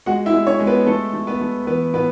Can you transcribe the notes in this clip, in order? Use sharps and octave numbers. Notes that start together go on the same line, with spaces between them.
G#3 F#4 F#5
E4 E5
G#3
C#4 C#5
G#3
B3 B4
A3 A4
A3
B3 B4
A3
E3 B3 B4
A2 B3 B4